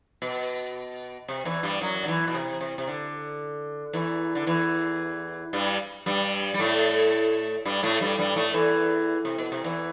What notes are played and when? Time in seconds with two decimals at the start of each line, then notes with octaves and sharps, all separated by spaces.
0.22 B2
1.28 C3
1.45 E2 E3
1.63 G2 G3
1.81 F#2 F#3
2.03 D3
2.08 E2 E3
2.27 B2
2.34 C3
2.61 C3
2.78 C3
2.87 D3
3.93 E2 E3
4.35 D3
4.47 E2 E3
5.53 G2 G3
6.06 G2 G3
6.54 G3
6.59 A2 A3
7.65 G2 G3
7.83 A2 A3
8.01 G2 G3
8.18 G2 G3
8.36 A2 A3
8.53 E2 E3
9.25 C3
9.38 B2
9.52 C3
9.64 E2 E3